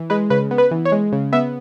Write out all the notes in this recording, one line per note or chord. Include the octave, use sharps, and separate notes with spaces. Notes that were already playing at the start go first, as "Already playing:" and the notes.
Already playing: E3
G#3 B4
C#3 B4
B3
B4
E3
C#5
G#3
C#3
B3 E5